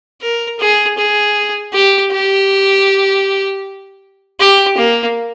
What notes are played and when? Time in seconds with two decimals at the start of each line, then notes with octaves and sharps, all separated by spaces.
0.21 A#4
0.59 G#4
0.98 G#4
1.73 G4
2.12 G4
4.40 G4
4.77 A#3